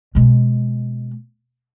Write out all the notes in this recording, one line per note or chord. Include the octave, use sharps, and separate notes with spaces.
B2 G#3